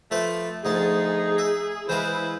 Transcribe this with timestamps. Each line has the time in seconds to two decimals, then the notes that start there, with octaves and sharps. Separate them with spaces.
0.11 F3 A3 B4 C5
0.65 D2 F3 D#4 G#4 A5
1.38 E5
1.89 E3 G#3 E4 B4 C5 F5